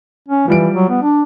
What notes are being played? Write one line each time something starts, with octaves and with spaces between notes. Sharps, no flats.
C#4
E3 F3 G3 D7
F#3
B3
D4